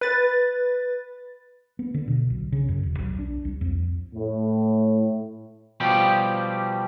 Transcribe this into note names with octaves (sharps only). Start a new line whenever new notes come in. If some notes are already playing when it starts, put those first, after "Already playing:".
B4 A6
B3
D3
B2
B1
C#3
F#2
E1
B1
D4
C2
F2
A2
B2 F3 G3 G4